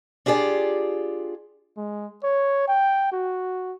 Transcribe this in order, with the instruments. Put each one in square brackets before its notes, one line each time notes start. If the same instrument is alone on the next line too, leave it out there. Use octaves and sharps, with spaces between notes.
[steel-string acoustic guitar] D4 F4 G4 G#4 D5
[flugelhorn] G#3
C#5
G5
F#4